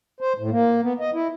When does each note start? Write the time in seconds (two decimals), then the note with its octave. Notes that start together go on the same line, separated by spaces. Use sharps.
0.20 C5
0.38 A2
0.51 A#3
0.83 B3
1.00 D#5
1.14 E4